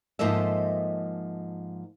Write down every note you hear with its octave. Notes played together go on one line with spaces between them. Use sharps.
G#2 F3 A#3 A4 D#5 E5